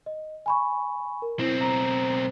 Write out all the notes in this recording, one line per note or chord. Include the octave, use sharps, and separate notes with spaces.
D#5
G#5 B5 C#6
A#4
B1 C4 E4
A#5